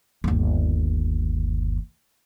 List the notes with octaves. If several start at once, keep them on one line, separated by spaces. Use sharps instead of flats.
G1 D#2